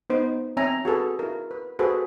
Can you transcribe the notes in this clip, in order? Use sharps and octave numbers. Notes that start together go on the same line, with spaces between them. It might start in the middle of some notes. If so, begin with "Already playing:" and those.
B3 D#4 C5
C4 C#5 E5 G#5 A#5
F#4 G#4 A4 B4
E4 A#4
B4
F#4 G#4 A4 B4 C5